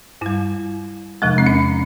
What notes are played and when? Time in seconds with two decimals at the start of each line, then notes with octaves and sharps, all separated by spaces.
0.21 G2 G3 E4
1.22 E2 C3 F3 G#3
1.38 C4
1.46 C#4